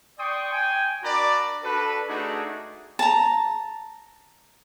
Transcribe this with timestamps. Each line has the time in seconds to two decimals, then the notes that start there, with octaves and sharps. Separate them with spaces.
0.18 D5 G5 C6 C#6 D#6
0.52 G5 G#5
1.03 D4 F#4 A#4 D5 A#5 B5
1.64 D4 F#4 A4 B4
2.08 A3 D4 D#4 F#4 G#4 D5
2.99 A5 A#5